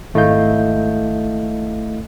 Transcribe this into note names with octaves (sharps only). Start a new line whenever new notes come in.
G#1 A3 E4 D#5 F5 G6